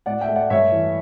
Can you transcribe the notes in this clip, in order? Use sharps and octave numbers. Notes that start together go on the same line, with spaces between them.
A2 D5 F#5
E5 G5
A3
D5 F#5
G2 C#5 E5
E3